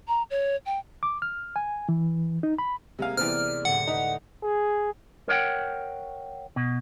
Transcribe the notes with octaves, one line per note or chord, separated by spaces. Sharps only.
A#5
C#5
G5
D6
F6
G#5
E3
D#4
B5
C3 G#3 A#3 G#4 F5
C3 E3 B3 C4 D5 F6
D2 A2 C3 F#5
D#4 B4
G#4
A#4 C#5 D5 F#5 G5
B2